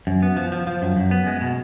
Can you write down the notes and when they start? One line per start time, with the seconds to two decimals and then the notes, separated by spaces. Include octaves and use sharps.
0.07 F#2
0.22 B3
0.37 F3
0.52 F3
0.67 F3
0.82 F#2
0.96 F#2
1.11 B3
1.27 G#3
1.41 B2